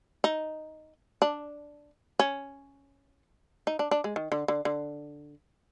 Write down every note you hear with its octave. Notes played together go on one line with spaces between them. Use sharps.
D#4
D4
C#4
D#4
D4
D4
G#3
D#3
D3
D3
D3